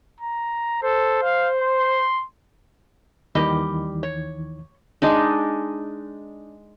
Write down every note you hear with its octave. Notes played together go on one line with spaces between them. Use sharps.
A#5
A4 C5
F5
C6
D#2 D#3 E3 G3 G4 D#5
C#5
G#3 D4 D#4